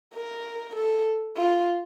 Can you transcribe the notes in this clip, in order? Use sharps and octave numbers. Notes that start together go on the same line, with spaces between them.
A#4
A4
F4